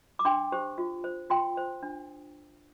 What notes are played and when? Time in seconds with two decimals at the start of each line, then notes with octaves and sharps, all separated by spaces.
0.19 D6
0.25 D4 G5 C6
0.52 G4 C5
0.78 F4
1.04 C5
1.30 F4 G5 C6
1.57 C5
1.83 D4